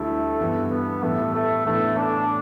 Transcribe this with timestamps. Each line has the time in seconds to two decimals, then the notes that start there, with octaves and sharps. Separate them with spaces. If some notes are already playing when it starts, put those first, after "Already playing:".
Already playing: D2 D3 G3 A3 E4
0.40 G2 E3 B3 G4
0.71 B3
1.03 A2 E3 G3 A3 B3 E4
1.34 A3
1.66 A2 E3 A3 B3 D4
1.98 D4